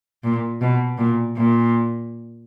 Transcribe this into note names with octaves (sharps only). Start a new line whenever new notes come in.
A#2
B2
A#2
A#2